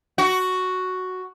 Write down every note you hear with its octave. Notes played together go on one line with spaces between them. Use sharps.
F#4